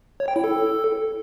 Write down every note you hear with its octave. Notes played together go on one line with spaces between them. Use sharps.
C#5
G5
E4
A4